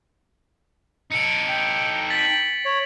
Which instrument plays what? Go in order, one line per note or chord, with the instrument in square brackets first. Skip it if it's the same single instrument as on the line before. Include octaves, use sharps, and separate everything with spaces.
[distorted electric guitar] D#4 A4 [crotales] C#7 D7
[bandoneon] G5
[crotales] A6 B6 F#7
[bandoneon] C#5